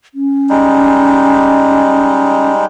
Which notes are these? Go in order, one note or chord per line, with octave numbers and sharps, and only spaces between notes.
C#4
G3 G#3 D#4